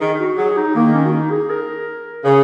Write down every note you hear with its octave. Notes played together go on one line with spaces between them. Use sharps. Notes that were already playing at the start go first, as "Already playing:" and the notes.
D#3 G#4
D#4
F#4
F#3 G#4
D#4
D#3 A#3
C#4
F#4
D#4
G#4
A#4
C#3